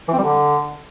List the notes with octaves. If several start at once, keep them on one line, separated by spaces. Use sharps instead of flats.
E3
C4
G3
D3